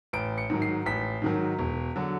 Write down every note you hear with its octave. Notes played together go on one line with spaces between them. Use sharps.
A1 D7
C#7
G#2 D#3 F#3
C7
A1 B6
G#2 D#3 F#3
E1
D3 F#3